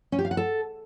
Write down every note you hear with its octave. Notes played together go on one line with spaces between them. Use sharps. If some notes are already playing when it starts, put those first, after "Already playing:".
C#4
G4
F5
F#5
A4